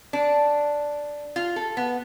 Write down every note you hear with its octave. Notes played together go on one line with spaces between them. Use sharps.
D4
F4
A4
B3